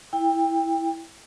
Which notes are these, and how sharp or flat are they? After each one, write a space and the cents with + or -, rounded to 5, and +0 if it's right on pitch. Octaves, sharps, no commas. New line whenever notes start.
E4 +0 G5 +25